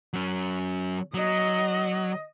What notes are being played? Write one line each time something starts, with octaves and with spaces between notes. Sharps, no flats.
F#3 C#4
F#3 D#5